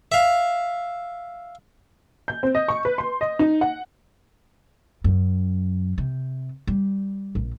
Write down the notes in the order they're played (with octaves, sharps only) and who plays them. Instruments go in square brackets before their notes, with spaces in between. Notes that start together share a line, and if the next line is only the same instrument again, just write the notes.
[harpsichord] E5 F5
[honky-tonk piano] G6
C4
D#5
C#6
B4
C6
D#5
D#4
F#5
[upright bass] F#2
C3
G3
A#1